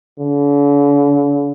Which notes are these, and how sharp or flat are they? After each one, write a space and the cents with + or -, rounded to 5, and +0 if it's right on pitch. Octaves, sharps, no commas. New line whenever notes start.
D3 -45